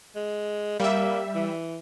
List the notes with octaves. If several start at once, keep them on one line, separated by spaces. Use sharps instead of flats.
G#3
G3 A#3 E5
E3